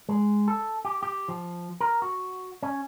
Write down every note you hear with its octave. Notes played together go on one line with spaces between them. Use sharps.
G#3
A4
G4
G4
F3
A#4
F#4
C#4